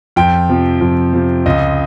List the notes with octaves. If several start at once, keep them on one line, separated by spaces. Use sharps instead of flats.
F2 G5
C3 F3
F2
C3 F3
C#2 D#5